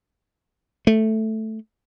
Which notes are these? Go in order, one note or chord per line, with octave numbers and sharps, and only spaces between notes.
A3